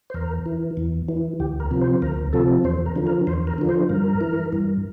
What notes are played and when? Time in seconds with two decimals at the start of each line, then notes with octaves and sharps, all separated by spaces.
0.10 C5
0.14 E2 A#4
0.46 E3
0.77 E2
1.09 E3
1.40 D2 G4
1.60 A#4
1.71 C3 F3
1.81 C5
2.02 D2 A#4
2.33 C3 F3 A4
2.64 E2 C5
2.86 A#4
2.96 D3 F3
3.07 A#4
3.27 E2 C5
3.47 A#4
3.58 D3 F3
3.69 C5
3.89 G2 A#4
4.21 E3
4.53 G2